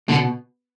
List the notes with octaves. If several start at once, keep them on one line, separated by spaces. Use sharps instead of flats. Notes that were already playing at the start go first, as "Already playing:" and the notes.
B2 D3